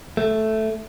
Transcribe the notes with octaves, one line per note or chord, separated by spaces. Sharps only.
A3